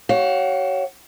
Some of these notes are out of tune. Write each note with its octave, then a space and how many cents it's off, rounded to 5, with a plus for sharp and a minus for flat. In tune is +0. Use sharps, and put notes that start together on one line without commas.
F#4 +45 C#5 +0 F5 +35